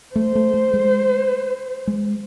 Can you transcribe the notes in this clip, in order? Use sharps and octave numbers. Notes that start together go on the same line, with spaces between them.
A3 C5
A3
A3
G#3
G#3